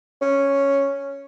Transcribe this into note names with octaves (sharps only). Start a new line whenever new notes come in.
C#4